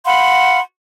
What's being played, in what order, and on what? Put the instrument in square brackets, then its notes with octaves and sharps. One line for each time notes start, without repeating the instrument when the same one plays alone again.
[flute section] F5 F#5 B5 C6